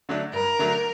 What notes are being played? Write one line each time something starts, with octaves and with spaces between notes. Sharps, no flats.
D3 F#3 A3 D4
G2 A#4
D3 F#3 A3 D4